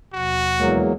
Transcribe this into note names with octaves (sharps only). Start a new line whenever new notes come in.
D#2 B2 F3 F#4
E2 F#3 G#3 A#3